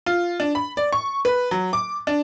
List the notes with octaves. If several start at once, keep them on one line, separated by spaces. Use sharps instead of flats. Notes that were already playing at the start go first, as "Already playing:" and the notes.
F4
D4
B5
D5
C#6
B4
F#3
D6
D4